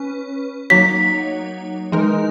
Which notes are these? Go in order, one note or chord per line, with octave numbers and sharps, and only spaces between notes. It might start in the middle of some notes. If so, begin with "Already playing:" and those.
Already playing: C#4 B4
F#3 A#3 D#4 F#4 C#5 B6
E3 G#3 D#4 A#4